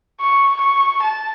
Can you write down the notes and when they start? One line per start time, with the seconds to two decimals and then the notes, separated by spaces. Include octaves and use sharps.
0.21 C#6
0.61 C#6
1.02 A5